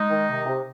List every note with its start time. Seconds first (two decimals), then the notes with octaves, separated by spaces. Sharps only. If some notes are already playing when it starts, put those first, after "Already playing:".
Already playing: G#3 D#4
0.10 D#3
0.28 C3
0.46 C3